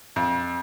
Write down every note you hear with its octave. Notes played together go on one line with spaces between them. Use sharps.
F2